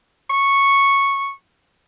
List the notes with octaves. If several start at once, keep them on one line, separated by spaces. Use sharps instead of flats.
C#6